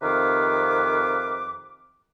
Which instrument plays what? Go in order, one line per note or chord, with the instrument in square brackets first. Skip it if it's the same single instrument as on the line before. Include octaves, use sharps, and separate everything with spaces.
[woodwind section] F2 C3 D#3 B4 F5 D6